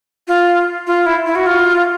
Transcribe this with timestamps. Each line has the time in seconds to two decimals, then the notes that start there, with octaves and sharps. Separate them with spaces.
0.28 F4
0.87 F4
1.06 E4
1.26 E4
1.35 F#4
1.46 F4